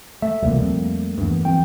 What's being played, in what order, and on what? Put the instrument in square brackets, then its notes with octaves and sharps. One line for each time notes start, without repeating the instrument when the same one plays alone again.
[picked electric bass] A3 [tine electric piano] E5
[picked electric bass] E1 C2 A#2 [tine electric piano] G3 A3 A#3
[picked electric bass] F2
E2 G2
[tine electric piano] F2 E3 G5